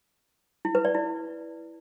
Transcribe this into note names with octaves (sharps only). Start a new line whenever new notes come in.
E4
B4
D5
E4